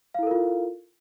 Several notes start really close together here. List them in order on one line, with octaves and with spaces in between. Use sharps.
F5 E4 A4 A#4 F4